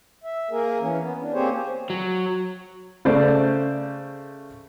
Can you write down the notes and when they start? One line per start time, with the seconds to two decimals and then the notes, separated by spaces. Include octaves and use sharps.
0.24 E5
0.51 A#3 G#4 A#4
0.80 E3 C#4
0.99 B3
1.21 D4
1.33 A#3 C4 G4 G#4 C5 C#5
1.90 F#3
3.05 C#3 A3 C5 D5